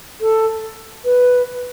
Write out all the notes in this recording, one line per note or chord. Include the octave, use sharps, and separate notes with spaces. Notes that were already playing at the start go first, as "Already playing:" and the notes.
A4
B4